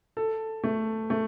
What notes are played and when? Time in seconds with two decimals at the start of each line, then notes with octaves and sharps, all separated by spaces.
0.17 A4
0.64 A3
1.10 A3